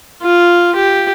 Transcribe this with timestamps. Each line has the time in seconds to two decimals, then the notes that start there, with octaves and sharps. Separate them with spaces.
0.23 F4
0.75 G4